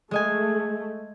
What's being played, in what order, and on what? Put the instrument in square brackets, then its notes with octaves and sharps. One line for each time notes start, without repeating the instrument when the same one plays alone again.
[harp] G#3 D#5 G#5 [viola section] A3